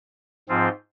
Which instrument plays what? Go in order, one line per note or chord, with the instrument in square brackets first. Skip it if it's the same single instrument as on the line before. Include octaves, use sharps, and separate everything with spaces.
[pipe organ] G#2 F3 C4 F4